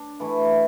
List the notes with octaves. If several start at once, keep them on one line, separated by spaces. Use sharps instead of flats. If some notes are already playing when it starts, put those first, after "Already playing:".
Already playing: D4
E3 A3 E4